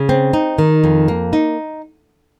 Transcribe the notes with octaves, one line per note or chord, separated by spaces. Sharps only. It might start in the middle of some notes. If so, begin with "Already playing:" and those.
Already playing: C#3
C4
D#4
D#3
F2
A#3
D#4